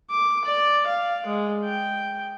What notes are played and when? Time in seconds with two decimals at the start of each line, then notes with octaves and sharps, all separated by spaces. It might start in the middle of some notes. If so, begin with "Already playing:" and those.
0.10 D6
0.45 D5
0.87 F5
1.27 G#3
1.64 G5